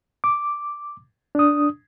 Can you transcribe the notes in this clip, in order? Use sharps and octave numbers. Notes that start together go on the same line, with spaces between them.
D6
D4 D#6